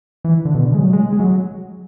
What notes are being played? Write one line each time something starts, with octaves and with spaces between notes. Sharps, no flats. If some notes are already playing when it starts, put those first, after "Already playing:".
E3
D3
B2
D3
G#3
F#3
G#3
G#3
F#3